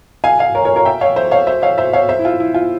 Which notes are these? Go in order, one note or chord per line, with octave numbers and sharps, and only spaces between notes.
F5 G#5
F5 G#5
A#4 C#5
A#4 C#5
A#4 C#5
E5 G5
C#5 F5
C5 E5
C#5 F5
C5 E5
C#5 F5
C5 E5
C#5 F5
C5 E5
E4
F4
E4
F4